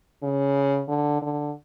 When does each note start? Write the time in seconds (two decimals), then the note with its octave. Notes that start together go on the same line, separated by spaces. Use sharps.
0.23 C#3
0.88 D3
1.22 D3